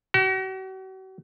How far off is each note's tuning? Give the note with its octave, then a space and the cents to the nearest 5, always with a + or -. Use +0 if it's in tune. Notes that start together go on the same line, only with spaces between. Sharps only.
F#4 +40